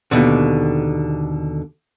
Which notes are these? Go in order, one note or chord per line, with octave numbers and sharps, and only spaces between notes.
D#2 B2 D3